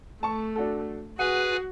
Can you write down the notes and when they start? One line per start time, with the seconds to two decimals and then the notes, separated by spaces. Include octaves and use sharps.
0.23 A3 A5 C#6
0.56 D4 F#4 A4
1.19 F#4 G#4 B4 F#5 G#5